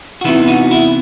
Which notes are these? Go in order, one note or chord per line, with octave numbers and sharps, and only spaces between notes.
F#4
C3 E3 B3 D#4 E4
D#4 F#4
E4